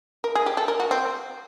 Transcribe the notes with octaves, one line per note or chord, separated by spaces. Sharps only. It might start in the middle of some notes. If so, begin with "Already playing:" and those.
A#4
G#4
G4
A4
A#4
F#4
C4